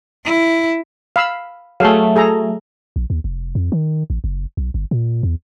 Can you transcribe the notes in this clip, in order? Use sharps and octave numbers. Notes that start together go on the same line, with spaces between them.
E4
F5 B5 E6
F#3 A3 G#4 A4 F5
G#4 A4 A#5
A#1
D#2
F1
F2
D#3
A1
F#1
B1
G1
A#2
E2